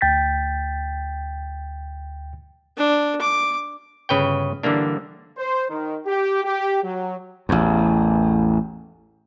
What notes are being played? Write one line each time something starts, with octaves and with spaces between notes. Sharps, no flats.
D2 G5 G6 A6 B6
D4
D6
G1 C#3 B4 C#5 G5
D3 E3 G3 A#3 D4
C5
D#3
G4
G4
F#3
A1 E2